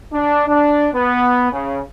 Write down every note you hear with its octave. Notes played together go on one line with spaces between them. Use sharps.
D4
D4
B3
C#3